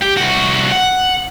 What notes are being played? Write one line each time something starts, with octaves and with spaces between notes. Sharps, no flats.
G4
C2 F#4
F#5